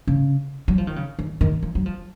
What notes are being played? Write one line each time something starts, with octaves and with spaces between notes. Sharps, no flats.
C#3
F#3
F3
D#3
C#3
D#3
D#3
F3
F#3
F3